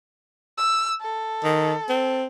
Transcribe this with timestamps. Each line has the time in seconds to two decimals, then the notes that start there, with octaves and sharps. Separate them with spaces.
0.58 E6
1.01 A4
1.44 D#3
1.89 C4